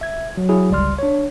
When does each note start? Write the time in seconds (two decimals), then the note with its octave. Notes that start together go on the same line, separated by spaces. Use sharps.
0.01 E5 G#6
0.37 F#3
0.49 F#3 E4 G#4
0.70 G1 C#2 G3 D5 C6 F6
0.99 D4 C#5